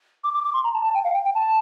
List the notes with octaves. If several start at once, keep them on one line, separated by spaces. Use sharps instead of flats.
D6
D6
D6
C6
A#5
A5
A5
G5
F5
G5
G5
A5